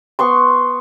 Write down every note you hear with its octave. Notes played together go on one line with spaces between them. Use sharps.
B3 C6 C#6